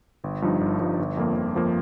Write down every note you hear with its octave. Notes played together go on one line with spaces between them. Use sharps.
G1
G2 F3 D#4
G1
G2 F3 D#4
G1
F2 F3 A#3
G1
F2 F3 A#3